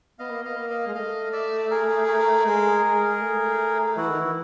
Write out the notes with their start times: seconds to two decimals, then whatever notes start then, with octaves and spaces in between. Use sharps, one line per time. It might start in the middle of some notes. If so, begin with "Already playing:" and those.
0.19 B3 D#5 F5
0.31 A#3
0.44 B3 D#5 F5
0.57 A#3
0.70 D#5 F5
0.87 G#3
0.94 A3 D#5 F5
1.33 D5 E5
1.71 G#4 A#4
2.08 G#4 A#4
2.46 G#3
2.84 G#3
3.21 A3
3.97 E3 E4 F#4
4.09 D#3
4.21 E3